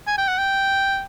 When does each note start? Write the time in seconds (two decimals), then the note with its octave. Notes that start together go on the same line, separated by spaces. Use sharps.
0.07 G#5
0.18 G5
0.28 F#5
0.38 G5